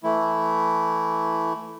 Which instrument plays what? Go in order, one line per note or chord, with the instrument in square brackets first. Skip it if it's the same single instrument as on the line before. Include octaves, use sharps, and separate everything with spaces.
[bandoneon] E3 A3 E4